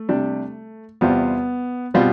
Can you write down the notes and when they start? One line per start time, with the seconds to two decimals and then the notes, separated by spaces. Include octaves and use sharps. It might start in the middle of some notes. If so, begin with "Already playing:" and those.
Already playing: A3
0.09 C3 G3 D4
1.01 E2 C3 G3 B3 C4 F4
1.94 B2 G3 B3 C4 F4